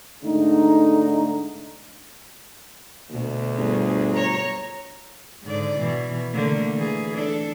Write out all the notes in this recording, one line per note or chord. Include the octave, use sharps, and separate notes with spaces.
G#2 D3 A3 D#4
D2 B2
G1 G#4
C#5 A#5
G#2 D3 D5
B2 E3
D3 A3 A#3
E3 G#4
D4 A4